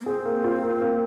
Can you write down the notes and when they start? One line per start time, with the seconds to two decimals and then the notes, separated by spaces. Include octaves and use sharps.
0.01 A#3
0.05 C4 G#4
0.25 A#3
0.44 F4
0.62 A#3
0.82 A#3